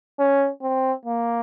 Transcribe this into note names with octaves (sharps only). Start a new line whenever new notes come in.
C#4
C4
A#3